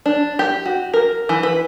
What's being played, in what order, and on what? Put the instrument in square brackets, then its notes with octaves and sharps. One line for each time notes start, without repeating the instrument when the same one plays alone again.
[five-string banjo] D4
G4
F#4
A#4
E3
B4